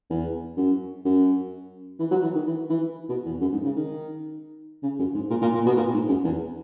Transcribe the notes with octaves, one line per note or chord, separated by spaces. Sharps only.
E2
F#2
F#2
E3
F#3
E3
D#3
E3
E3
B2
E2
F#2
G#2
C#3
D#3
C#3
F#2
G#2
A#2
A#2
A#2
B2
A#2
G#2
F#2
E2